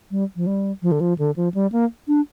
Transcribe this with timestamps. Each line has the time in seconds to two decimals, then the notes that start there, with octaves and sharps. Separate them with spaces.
0.11 G3
0.36 F3
0.47 G3
0.82 F3
0.92 D3
1.01 F3
1.19 D3
1.36 F3
1.54 G3
1.72 A#3
2.08 D4